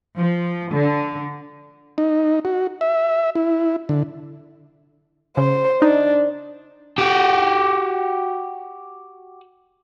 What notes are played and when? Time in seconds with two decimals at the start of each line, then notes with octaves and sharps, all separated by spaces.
0.17 F3
0.73 D3
1.98 D#4
2.45 F#4
2.81 E5
3.35 E4
3.89 D3
5.37 C#3 C5
5.82 D4 D#4
6.98 F#4 G4